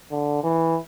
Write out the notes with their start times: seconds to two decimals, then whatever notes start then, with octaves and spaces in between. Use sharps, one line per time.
0.11 D3
0.43 E3